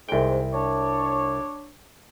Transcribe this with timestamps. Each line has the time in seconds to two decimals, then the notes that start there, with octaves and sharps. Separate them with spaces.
0.09 C2 G#2 G5
0.53 D4 C#5 D5